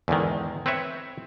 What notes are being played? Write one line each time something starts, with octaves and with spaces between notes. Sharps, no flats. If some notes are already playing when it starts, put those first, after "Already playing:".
E2 G#2 D3 D#3
C4 B4 C#5 E5